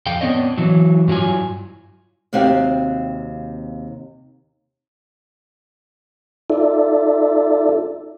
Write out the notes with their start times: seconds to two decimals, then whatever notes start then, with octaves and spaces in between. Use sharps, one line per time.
0.06 F2 A4 F5 G5
0.21 B3 C4 D4 C#5 D#5
0.58 E3 F#3
1.08 G2 F#3 E4 F4 G#5
2.33 D#2 C3 C4 F#4 G4 F5
6.50 D#4 F4 A4 D5 E5